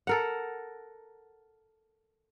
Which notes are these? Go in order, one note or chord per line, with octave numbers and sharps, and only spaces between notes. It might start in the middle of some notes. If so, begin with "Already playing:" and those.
A4 A#4 F#5